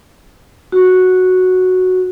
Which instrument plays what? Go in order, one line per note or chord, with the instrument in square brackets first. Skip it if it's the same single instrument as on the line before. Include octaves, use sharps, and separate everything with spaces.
[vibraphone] F#4